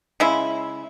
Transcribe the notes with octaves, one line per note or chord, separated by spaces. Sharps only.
C#3 G#3 E4